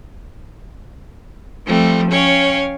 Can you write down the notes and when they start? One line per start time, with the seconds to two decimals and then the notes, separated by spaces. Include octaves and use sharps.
1.66 F3 G3 A3 C4
2.11 C#4 C#5 F5 G5